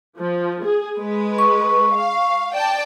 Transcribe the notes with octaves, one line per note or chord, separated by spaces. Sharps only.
F3
G#4
G#3 B4
C#6
F5
D5 G5 A5